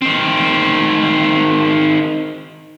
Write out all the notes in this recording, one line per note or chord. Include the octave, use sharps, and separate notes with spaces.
D#3 C4